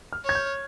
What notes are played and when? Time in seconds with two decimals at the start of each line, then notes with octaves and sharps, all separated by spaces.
0.13 F6
0.24 C#5
0.29 G#6
0.35 G6